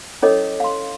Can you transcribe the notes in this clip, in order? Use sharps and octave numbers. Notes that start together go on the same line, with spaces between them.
C#4 E4 A4 C#5 D#5 D6
F5 C6